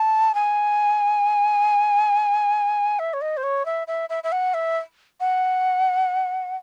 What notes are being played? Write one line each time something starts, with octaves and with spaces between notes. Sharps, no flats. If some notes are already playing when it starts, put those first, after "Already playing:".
Already playing: A5
G#5
E5
C#5
D#5
C5
C#5
E5
E5
E5
E5
F#5
E5
F#5